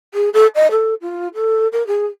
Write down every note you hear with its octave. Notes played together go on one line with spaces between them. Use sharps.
G#4
A4
D#5
A4
F4
A4
A#4
G#4